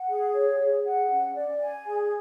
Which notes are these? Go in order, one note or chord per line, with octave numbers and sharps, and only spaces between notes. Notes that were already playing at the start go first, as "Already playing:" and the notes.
Already playing: F#5
G#4
C#5
G#4
F#5
C#4
D5
G#5
G#4